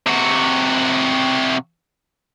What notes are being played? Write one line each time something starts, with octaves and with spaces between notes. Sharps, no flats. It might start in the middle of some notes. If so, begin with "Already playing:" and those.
C3 F#4